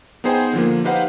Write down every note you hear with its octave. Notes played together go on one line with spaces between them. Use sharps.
B3 D#4 G#4 C5 G5 G#5
D3 F3 A#3
D#4 G4 B4 C5 F5 F#5